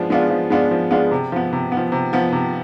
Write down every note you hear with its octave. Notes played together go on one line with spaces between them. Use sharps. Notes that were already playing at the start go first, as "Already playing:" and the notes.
Already playing: F3 G#3 B3 D4
G#3 B3 D4 F4
F3
G#3 B3 D4 F4
F3
G#3 B3 D4 F4
C3
F3 B3
C3
B3
F3
C3
F3 B3
C3